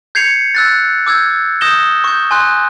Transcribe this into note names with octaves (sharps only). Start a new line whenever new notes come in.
G6 G#6 C7 C#7 F7
E6 F#6 A6
D6 E6 G6 G#6
D#6 G6 A#6 E7 G7
C#6 G6
G#5 C6 F#6